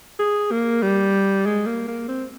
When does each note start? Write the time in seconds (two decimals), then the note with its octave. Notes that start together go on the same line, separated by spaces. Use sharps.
0.19 G#4
0.51 A#3
0.83 G3
1.46 G#3
1.66 A#3
1.88 A#3
2.08 C4